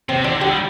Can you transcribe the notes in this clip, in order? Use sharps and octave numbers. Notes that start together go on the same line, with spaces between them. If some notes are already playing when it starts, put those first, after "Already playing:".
C3 C4
D3 D4
D3 G4
G3